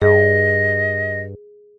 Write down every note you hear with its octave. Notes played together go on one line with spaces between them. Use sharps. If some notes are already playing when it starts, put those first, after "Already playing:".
G2 G#4 D#5